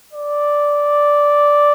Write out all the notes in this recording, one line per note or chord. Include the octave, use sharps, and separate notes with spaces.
D5